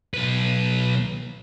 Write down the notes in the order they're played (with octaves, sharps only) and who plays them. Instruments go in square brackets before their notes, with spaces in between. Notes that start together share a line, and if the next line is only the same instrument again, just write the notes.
[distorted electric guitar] B1 B4